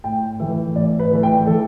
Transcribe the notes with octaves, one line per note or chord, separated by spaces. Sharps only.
A2 G5
E3 A3 E5
A2 D5
B4
E3 A3
G5
E3 A4